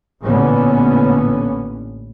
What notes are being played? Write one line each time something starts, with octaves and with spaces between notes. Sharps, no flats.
A1 A#2 D3 E3 B3 C#4